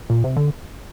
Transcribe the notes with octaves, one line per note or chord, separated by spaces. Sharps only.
A#2
C3
D3